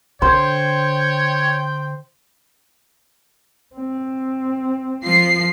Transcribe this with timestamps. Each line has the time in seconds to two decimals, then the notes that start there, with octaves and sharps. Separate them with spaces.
0.22 D3 C5 C#5 G5
3.76 C4
5.05 F3 C7